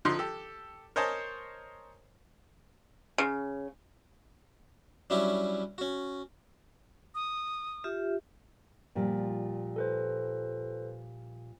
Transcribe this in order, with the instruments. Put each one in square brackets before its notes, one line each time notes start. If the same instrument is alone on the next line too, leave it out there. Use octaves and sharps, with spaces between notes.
[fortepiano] D3 F3 D#4 C6
G4 A4
A#4 C5 C#5 D#5 G#5 A5
[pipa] C#3
[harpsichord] F#3 G3 C#4 D4 E4 G4
C#4 F#4
[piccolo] D#6
[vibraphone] F4 G4 E5
[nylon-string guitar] A#2 F3 G3
[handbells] A4 B4 C5